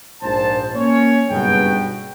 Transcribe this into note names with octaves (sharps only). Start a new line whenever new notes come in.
A#1 G#2 C5 A5
A#3 C#4 C#5
F#1 G2 B2 F#3 G#4 G5